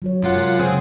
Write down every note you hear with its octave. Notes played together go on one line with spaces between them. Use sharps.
F#3 F#4 C#5
F#2 C3 G#3 F4 C#5 F#5
C#3 C4 G#4